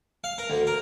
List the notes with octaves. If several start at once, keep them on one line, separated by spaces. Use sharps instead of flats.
F5
A#4
D2
A#4